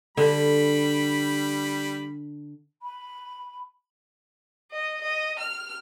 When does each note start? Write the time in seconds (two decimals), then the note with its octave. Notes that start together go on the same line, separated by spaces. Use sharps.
0.17 D3 G3 B5
2.82 B5
4.71 D#5
5.02 D#5
5.39 F6